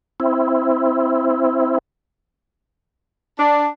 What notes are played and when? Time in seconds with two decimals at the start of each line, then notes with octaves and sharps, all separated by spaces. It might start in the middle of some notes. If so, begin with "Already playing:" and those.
0.20 C4 E4
3.39 D4